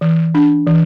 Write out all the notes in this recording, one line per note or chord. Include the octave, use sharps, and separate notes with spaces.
E3
D4
E3